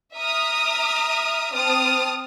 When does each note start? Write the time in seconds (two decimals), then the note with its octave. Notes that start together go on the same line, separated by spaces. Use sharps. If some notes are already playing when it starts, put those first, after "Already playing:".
0.15 E5 A#5 D#6 F6
1.53 C4 A5 D#6 F6